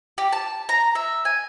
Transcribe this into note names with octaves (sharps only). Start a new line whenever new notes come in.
G4
A5
A#5
E5
G#5